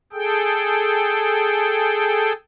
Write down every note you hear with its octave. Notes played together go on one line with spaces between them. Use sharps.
G#4 A4 G5